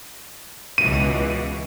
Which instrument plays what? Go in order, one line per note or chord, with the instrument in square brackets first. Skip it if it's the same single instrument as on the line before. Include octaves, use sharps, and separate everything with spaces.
[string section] C#2 B2 E3 [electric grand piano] D#7